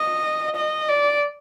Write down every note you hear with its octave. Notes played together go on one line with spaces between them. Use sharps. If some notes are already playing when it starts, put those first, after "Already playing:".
Already playing: D#5
D#5
D5